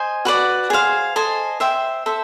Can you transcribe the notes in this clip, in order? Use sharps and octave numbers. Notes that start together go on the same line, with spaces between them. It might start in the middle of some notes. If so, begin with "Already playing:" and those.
Already playing: C5 D#5 G#5
F#4 B4 D5 F#5
G#4 C5 F5
A4 C5 D#5 G#5
C5 E5 G5
A4 C5 E5